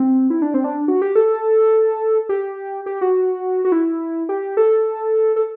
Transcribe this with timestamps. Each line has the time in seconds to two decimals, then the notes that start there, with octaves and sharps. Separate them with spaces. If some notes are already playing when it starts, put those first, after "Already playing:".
Already playing: C4
0.30 E4
0.42 D4
0.54 C4
0.64 D4
0.88 F#4
1.02 G4
1.15 A4
2.29 G4
2.86 G4
3.01 F#4
3.65 F#4
3.72 E4
4.29 G4
4.57 A4
5.36 A4